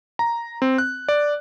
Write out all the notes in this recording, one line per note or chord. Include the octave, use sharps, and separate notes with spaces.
A#5
C4
F#6
D5